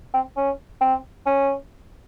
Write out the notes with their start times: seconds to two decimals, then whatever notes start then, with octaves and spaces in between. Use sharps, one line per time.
0.14 C4
0.37 C#4
0.81 C4
1.26 C#4